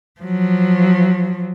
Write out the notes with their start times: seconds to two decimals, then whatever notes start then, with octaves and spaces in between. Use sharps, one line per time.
0.21 F3 F#3